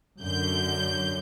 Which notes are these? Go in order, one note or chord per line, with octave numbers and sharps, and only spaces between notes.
F#2 D3 G6